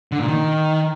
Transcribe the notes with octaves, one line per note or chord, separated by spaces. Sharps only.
D3
A#2
D#3